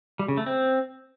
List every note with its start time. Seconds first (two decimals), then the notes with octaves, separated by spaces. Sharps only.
0.19 G3
0.28 C#3
0.37 A3
0.46 C4